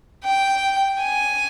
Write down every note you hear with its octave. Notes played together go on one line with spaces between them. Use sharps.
G5
G#5